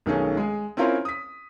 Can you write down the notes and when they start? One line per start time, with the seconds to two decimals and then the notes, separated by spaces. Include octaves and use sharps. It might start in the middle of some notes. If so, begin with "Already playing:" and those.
0.06 B1 D#3 A3 C#4 G#4
0.37 G#3 G#4
0.77 C4 C#4 E4 F4 A#4 C5
1.05 D#6 B6